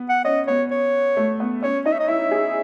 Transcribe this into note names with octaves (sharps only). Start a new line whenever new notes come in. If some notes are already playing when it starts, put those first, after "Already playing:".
Already playing: B3
F#5
C#4 D#5
B3 C#5
C#5
A3
B3
C#4 C#5
D#4 D#5
E5
D#5
E4 E5
G#4